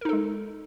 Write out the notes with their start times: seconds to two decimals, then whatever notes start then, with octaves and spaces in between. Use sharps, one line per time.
0.01 A#4
0.05 D#4
0.09 A4
0.13 G#3